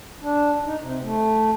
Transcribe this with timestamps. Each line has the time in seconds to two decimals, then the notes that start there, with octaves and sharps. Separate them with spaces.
0.21 D4
0.63 D#4
0.79 C3
1.02 A3